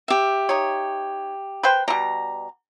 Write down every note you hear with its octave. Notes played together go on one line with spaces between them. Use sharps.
G4 E5
D#4 C#5
B4 C5 G5
B2 G3 A#5